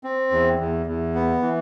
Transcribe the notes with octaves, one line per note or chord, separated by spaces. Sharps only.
C4
E2
E2
E2
B3
E3